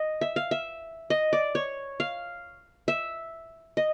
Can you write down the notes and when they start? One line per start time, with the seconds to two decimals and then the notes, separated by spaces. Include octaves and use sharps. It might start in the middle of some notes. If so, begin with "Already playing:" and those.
Already playing: D#5
0.21 E5
0.36 F5
0.51 E5
1.10 D#5
1.33 D5
1.55 C#5
2.00 F5
2.88 E5
3.77 D#5